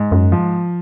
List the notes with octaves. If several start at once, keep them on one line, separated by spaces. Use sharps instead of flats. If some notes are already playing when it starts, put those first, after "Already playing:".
Already playing: G#2
F#2
F3